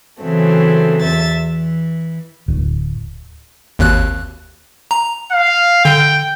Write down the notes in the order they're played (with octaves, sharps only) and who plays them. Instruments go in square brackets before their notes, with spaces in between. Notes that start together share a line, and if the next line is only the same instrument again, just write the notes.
[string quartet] C#3 E3 F#3 A3 C4
E2 E5 A6
E3
[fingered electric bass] D1
[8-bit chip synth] G#1 D#2 F#6
A#5
[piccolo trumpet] F5
[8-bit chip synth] D3 [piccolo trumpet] G5